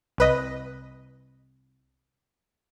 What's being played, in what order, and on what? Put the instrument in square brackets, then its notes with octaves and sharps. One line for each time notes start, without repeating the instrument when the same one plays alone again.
[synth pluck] C2 B4 D#5